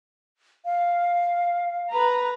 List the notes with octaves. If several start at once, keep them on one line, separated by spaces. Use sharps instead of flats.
F5
B4 A#5